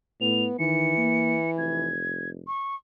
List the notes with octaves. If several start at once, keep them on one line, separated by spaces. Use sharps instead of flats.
A2 B3 F7
D#3 E3 C#7
A#3
F1 G#6
C#6